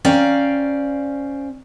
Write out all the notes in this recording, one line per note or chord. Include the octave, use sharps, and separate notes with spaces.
C#4 C5 D5 F5 G5 A#5